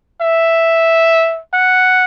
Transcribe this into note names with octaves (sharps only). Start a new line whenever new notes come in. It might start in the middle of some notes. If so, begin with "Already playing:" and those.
E5
F#5